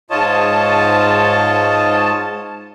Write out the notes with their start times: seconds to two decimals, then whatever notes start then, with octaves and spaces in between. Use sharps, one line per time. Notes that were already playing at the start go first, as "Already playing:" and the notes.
0.10 G#2 F4 C#5 D#5 A5